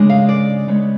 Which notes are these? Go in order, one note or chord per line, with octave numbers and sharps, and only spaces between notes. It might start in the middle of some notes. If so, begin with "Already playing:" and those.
Already playing: C#3 G#3 D4
F5
D5
C#3 G#3 B3